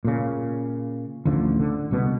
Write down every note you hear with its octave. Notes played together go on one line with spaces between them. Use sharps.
A#2 C#3
A1 D2 D3 F3
D3
C2 B2 B3